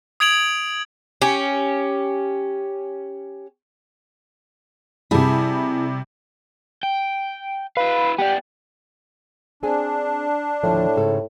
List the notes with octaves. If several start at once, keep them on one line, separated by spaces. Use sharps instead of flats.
D#6 G#6 D7 F7 F#7
C#4 G4
C3 G3 E4 G#4 A5
G5
E4 B4 F5
B3 G4 D5
C4 D4 G#4 G#5
D#2 A2 D3 F3
G#2 C#3 A4